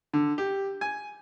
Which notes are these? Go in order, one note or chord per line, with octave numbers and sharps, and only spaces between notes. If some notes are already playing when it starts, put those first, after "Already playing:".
D3
G4
G#5